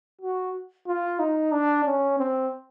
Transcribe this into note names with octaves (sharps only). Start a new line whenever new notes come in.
F#4
F4
D#4
D4
C#4
C4